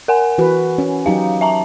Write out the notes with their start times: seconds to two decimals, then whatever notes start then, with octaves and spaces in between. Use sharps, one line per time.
0.08 A#4 F#5 G#5
0.38 E3 F#4 B4
0.78 C#4
1.06 F#3 D#4 G4 F5
1.41 E5 A5 A#5